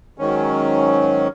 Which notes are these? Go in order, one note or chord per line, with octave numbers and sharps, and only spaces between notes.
G#2 D#3 F#3 C#4